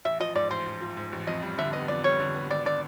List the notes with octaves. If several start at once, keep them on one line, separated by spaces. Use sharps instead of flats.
A1 E5
F3 D#5
G#2 D5
A1 C5
A1
F3
G#2
A1
F2 D#5
G3
D3 E5
B3 D#5
F2 D5
G3 C#5
D3
B3
G#1 D5
D3 D5